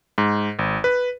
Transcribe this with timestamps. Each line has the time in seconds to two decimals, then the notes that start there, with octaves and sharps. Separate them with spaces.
0.18 G#2
0.59 G#1
0.84 B4